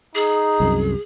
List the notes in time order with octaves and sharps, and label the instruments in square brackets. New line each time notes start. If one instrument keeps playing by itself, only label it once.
[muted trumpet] D#4 [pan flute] G#4
[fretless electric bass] C2 F#2